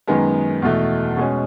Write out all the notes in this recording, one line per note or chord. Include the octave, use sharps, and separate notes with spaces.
F#2 D#3 G#3 B3
E2 B2 A3
B2 G#3 C#4